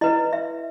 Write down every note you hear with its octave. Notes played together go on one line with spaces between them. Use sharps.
E4 B4 D#5
E5